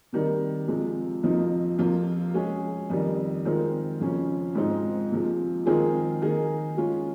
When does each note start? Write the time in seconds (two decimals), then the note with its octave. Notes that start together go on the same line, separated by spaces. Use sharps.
0.13 C3 D#3 G3
0.68 C3 F3 G#3
1.23 F2 C3 F3 A#3 D#4
1.78 F2 C3 F3 A#3 F4
2.34 G#3 C#4 G#4
2.90 F2 D#3 G3
3.45 D#3 G#3 C4 F4
4.00 F2 C#3 F3 A#3 C#4
4.55 G#2 F3 G#3 C4 D#4
5.11 C3 F3 G#3
5.66 D#3 G#3 C4 F4 G#4
6.22 D#3 A#3 D#4 G#4
6.77 G#3 C#4 F4